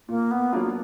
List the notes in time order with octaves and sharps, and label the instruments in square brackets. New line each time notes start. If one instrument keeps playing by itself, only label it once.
[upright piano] A#2 [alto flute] A#3
[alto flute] B3
[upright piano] F#3 A#3 F4 [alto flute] D4